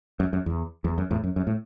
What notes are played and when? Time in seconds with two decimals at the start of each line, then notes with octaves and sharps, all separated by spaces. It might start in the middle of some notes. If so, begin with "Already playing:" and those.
0.20 F#2
0.33 F#2
0.46 E2
0.84 E2
0.98 F#2
1.11 E2 A2
1.24 F#2
1.36 F#2
1.47 A2